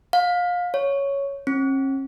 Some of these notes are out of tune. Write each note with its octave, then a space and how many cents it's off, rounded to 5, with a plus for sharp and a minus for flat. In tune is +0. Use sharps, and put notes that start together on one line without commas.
F5 +25
C#5 +5
C#4 -45